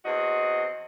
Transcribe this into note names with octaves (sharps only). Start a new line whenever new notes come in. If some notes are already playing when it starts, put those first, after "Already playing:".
E2 C4 F#4 D#5